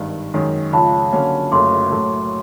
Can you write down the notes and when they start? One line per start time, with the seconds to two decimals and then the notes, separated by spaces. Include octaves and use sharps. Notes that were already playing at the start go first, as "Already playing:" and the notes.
Already playing: G#1 G2 D#3
0.34 F#2 D#3 G#3
0.72 C#2 C#3 F3 A5 B5
1.12 D3 F#3 A#3 C#4
1.52 F#1 F#2 C#3 F#3 A3 C6 D6
1.91 A2 F#3 A3